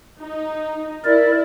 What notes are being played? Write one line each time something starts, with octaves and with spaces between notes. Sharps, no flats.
D#4
E4 A#4 D5